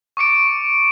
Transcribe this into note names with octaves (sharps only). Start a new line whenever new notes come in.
C#6 D6 C#7 D7